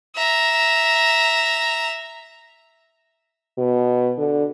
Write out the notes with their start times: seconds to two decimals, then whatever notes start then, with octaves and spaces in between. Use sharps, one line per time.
0.15 E5 A#5
3.58 B2
4.18 D3